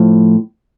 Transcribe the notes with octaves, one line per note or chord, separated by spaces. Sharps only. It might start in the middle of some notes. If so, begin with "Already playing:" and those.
Already playing: A2 F3